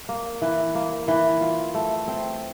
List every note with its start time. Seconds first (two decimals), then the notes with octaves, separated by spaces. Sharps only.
0.09 A#3
0.42 E3
0.75 A#3
1.08 E3
1.41 F4
1.74 A3
2.08 C4